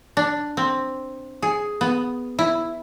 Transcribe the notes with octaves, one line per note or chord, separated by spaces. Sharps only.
D4
C4
G#4
B3
E4